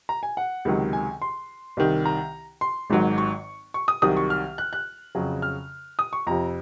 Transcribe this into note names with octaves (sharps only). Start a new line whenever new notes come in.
A#5
G#5
F#5
C#2 C3 D#3 F#3
G#5
C6
C2 C3 D#3
A#5
C6
G#1 G#2 D#3 F#3
C#6
C#6
D#6
C2 C3 D#3 F#3 D#6
C#6
F6
F#6
F#6
F2 C#3 F#3
F6
D#6
C#6
F2 C3 F3 A#5